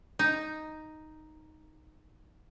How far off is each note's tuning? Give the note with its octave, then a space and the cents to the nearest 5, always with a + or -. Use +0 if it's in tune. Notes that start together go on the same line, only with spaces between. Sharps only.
D#4 +0